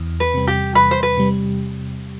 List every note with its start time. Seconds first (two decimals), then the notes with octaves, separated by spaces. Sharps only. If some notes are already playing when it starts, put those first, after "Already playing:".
Already playing: E2
0.20 B4
0.34 C3 G3
0.47 G4
0.75 E2 B4
0.91 C5
1.03 B4
1.17 C3 G3